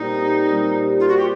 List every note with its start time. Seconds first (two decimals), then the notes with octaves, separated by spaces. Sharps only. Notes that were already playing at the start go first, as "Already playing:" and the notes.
Already playing: A#2 G3 C4 D#4
0.49 A#2 G3 C4
1.00 F4
1.08 F#4
1.17 G4